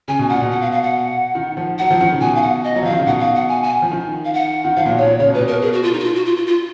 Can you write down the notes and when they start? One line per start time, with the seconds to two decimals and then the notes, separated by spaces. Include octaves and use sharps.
0.08 C#3 G#5
0.19 B2
0.29 A#2 F#5
0.42 B2
0.51 F#5
0.61 F5
0.72 F5
0.83 F#5
1.35 D#3
1.57 F3
1.78 F#3 F#5
1.91 F3
2.01 D#3
2.11 C#3
2.21 B2 G#5
2.35 F5
2.42 F#5
2.64 D#5
2.76 F#3
2.83 F3 F5
2.91 D#3
2.99 C#3
3.06 B2 F#5
3.20 F5
3.35 F#5
3.49 G#5
3.63 G#5
3.82 F3
3.92 D#3
4.25 F5
4.33 F#5
4.65 D#3
4.77 F3 F5
4.85 A#2
4.90 B2
4.97 C#5
5.05 A#2
5.19 C#3 C#5
5.26 B2
5.34 A#2 B4
5.40 B2
5.47 A#4
5.62 G#4
5.73 F#4
5.83 F4
5.93 D#4
5.99 F#4
6.04 F4
6.15 F#4
6.25 F4
6.36 F4
6.47 F4